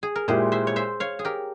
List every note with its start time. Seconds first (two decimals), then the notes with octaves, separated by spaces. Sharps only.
0.03 G#4
0.15 A#4
0.28 A#2 G#3 E4 G4 G#4 C5
0.52 C5 E5
0.67 C#5
0.76 C5 E5
1.00 C#5 F5
1.19 G#4
1.25 G4 A#4